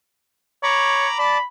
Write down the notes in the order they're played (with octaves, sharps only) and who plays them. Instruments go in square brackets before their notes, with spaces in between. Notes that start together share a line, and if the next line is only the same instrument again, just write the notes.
[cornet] C#5 [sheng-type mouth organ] A#5 B5 D6
[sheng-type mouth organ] D5 A5 [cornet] B5